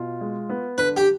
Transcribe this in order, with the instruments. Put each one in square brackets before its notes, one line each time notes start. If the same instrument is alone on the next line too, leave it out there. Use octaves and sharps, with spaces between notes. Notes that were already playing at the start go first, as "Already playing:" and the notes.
Already playing: [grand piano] B2 F4
G#3
B3
[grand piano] D3 [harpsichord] B4
[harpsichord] G4